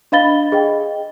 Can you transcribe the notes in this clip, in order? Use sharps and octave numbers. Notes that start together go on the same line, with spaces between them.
D4 D#5 F5 B5 A6 G7
G#4 D#5 G5